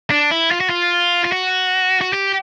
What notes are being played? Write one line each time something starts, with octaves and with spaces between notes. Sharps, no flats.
D4
E4
F4
F#4
F4
F4
F#4
F#4
G4